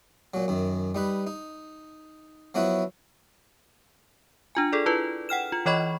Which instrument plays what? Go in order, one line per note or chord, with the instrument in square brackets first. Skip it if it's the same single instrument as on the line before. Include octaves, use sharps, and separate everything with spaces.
[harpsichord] A#2 F#3
F#2 D#3
G3 D#4 B4
D#4
F3 F#3 B3 E4 B4 C#5
[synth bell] D4 F4 G#5
G#4 A4 D5
E4 F4 B4
F#5 G5 F6 E7
F4
E3 A4 C#5 D#5 B5 C#6